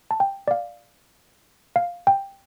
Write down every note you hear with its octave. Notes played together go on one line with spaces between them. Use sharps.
A5
G5
D5
F5
F5
G5